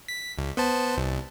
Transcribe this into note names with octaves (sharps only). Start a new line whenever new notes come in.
B6
C#2
B3 C5 A5
C2